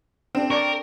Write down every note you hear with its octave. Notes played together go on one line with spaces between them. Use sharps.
C4 D4
A#4 D5 C#6